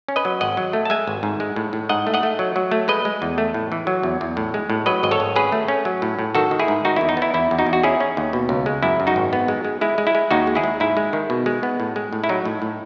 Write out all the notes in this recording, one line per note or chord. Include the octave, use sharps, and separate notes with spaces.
C#4
B4 D#5
F#3
G#1 D#5 F#5
F#3
A3
A5
G#3 E5 G#5
G#1
G#2
G#3
A2
A2
G#2 D#5 F#5
A3
D#5 F#5
A3
F#3
F#3
A3
G#3 B4 D#5
G#3
E2
A3
A2
E3
F#3
E2
E2
A2
G#3
A2
F#3 B4 D#5
G#1 D#5
A4 C#5
G#1
C#4 G#4 B4
A3
C#4
F#3
A2
A2
D#3 F#4 A4
D#3
E4 G#4
G#2
D#3 D#4 F#4
E2 E4
D#4
B3 E4
E2 E4
E2
D#4 F#4
E2
F#4
C#4 E4 G#4
C#4
D#2
B2
C#2
G#3
F#2 E4
F#2
D#4 F#4
G#1
B3
G#3
G#3
G#3 E4
G#3
E4
G#3
D#2 D#4 F#4
G#3
E4 G#4
G#3
G#2 E4
G#3
D#3
B2
G#3
B3
A2
G#3
A2
E4
F#3 D#4
A2
A2